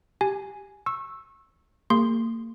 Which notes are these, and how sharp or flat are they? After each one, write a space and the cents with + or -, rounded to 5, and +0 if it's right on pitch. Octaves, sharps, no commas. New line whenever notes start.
G4 +0 G#5 +0
C#6 -25 E6 +0
A#3 -35 G#4 -45 C6 +0